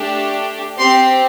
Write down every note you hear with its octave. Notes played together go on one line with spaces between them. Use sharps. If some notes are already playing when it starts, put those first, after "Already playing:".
Already playing: A3 D4 G4
C4 G4 C6